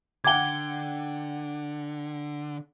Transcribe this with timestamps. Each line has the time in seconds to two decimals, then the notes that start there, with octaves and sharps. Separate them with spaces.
0.24 D3 F#5 G5 D6 G#6 G7